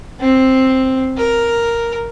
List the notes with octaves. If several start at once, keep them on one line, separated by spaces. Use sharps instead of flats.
C4
A#4